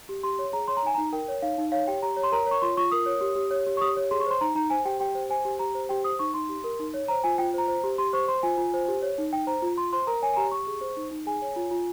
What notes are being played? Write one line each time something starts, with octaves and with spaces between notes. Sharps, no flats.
G4
G4 C6
C#5
G#4 A#5
C#5 C6
A#5
D#4 G#5
D#4 A#5
A#4 G5
C#5
D#4 F5
D#4
C#5 F5
G4 G5
G4 A#5
C#5
C6
A#4 A#5
C#5 C#6
F4 C6
F4 C#6
A#4 D#6
C#5
G4
G4
C#5
G4
C#6
G4 D#6
C#5
G#4 C6
C#6
C5 C6
D#4 A#5
D#4 A#5
C5 G#5
G4 G5
G4 G5
C5
C5 G#5
G4
G4 A#5
C5
G4 G5
C5 D#6
D#4 C#6
D#4 C6
G4
A#4
D#4
C#5
C5 A#5
F4 G#5
F4 G5
C5 A#5
C5
G4
G4 C6
C5 C#6
C5 C6
F4 G#5
F4
C5
G4
C#5
D#4
D#4 G5
C5 A#5
F4
F4 C6
C5 C6
A#4 A#5
C#5 G#5
G#5
G4 A#5
G4 C#6
G#4
C5
D#4
D#4
G#4 G#5
C#5
F4
F4